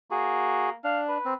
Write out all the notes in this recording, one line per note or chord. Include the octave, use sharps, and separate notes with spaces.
A#3 F#4 G#4
D4 F5
B4
C4